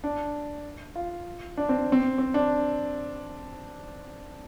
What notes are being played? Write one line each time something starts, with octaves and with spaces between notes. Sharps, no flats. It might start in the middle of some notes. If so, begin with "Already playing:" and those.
D4
F4
D4
C4
C4
C4
D4